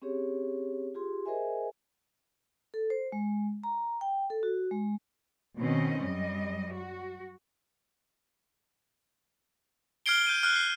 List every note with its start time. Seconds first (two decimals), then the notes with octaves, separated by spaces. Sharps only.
0.02 C4 C#4 G4 G#4 C#5
0.94 F4 G4 G#4 C6
1.26 G#4 A#4 C5 D#5 E5 G#5
2.74 A4
2.90 C5
3.12 G#3
3.64 A#5
4.01 G5
4.30 A4
4.43 F#4
4.71 G#3
5.58 B2 D#3 C4 C#4 D#5
6.03 F#2 G3 D#5
6.73 F#4
10.06 F6 F#6 G#6 C7 D7 G7
10.27 G6 D#7
10.43 F6 F#6
10.56 C7